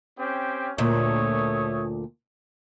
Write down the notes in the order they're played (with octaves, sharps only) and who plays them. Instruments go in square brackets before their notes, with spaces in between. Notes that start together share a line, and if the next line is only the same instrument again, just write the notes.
[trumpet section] C4 C#4 G4
[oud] D2 A#2 [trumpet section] A3 C#5 D#6